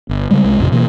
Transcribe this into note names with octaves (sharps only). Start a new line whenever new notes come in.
G1
C#3 G3 G#3
C2 G#3
A1 F2 C3
B2 E3 A#3